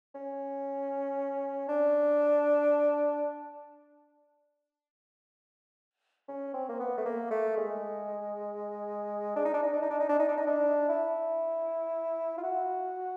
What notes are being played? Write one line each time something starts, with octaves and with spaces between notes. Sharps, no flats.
C#4
D4
C#4
C4
A#3
B3
A3
A#3
A3
G#3
D4
D#4
D4
D#4
D4
D#4
D4
D#4
D4
D#4
D4
D#4
D4
E4
F4
F#4